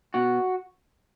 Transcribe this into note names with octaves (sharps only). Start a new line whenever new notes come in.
B2 F#4